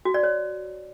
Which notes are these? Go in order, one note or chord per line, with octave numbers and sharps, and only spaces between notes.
F#4
D5
C#5